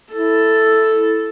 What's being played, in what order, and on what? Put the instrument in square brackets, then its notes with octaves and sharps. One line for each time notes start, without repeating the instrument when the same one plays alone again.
[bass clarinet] E4 [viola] A4